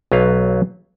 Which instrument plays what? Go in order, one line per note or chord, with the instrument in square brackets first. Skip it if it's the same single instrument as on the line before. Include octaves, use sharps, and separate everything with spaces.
[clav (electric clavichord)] B1 F#3 B4 F5